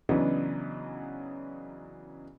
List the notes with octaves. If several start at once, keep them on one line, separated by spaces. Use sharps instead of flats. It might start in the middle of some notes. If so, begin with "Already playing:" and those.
C#3 E3 F#3 B3 D4 D#4